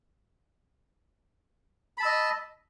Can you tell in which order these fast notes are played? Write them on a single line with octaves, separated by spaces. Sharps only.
B5 A5 E6 D#5